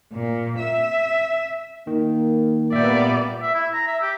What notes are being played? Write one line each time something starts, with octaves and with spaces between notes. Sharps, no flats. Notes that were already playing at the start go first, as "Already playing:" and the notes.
A#2
E5
D#3 A#3
A#2 G3 B3 D5 E5 G5
E5
E4
A#5
E5
G4